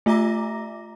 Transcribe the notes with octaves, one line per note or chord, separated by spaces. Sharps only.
A3 F4 E5 A#5 D6 A#6